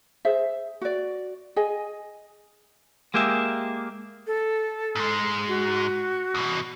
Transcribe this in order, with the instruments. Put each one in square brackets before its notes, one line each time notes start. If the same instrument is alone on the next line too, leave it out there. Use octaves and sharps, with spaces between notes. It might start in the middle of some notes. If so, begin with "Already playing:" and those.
[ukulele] G#4 C5 E5
F#4 D5
G#4 D#5 G#5
[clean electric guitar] G#3 A#3 G4 G#4 E5
[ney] A4
[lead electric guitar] G#2 G#3
[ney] F#4
[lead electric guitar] E2 B2